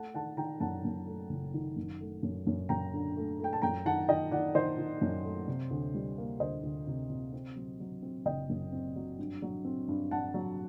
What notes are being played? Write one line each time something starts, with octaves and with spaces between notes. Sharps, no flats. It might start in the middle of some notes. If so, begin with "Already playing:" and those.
Already playing: A3 F#5 A5
D#3 F#5 A5
D#3 G5 A#5
F#2 F#5 A5
F#2
A3
F#1
D#3
F#2
A3
F#2
F#2
F#2 G5 A#5
D3
A3
A3 G5
A5
F#2 G5 A#5
D#3 F#5 A5
D#3 D#5 G5
D#3 D5 F#5
D#3 C5 D#5
D#3
F#2
A3
C3
D2
G3
A#3
D2 C5 D#5
D2
C3
C3
C4
F#3
F#3
C4
F#1 D#5 G5
F#2
C4
F#3
G2
F#3
C4
G2
G2 F#5 A5
F#3